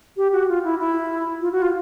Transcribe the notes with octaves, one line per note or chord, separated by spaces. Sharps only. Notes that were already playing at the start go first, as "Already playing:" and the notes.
G4
F#4
F4
E4
E4
F4
F#4
F4